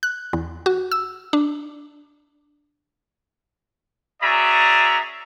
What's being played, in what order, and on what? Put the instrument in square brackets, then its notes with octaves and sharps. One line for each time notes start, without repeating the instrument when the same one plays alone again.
[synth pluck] F#6
E2
F#4
E6
D4
[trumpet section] C#4 F#4 G#4 D5 E5 A#5